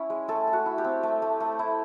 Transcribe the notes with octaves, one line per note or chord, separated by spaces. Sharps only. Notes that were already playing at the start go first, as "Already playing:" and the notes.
Already playing: C#4 E4
G#3
A3 A4
A3
F#4
E4
G4
C4
A3
A3
A3
E4